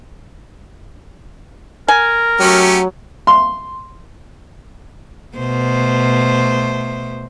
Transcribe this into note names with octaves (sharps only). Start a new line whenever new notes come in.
A#4 G#5
F#3 A3 C#4 G4
C6
B2 A3 C5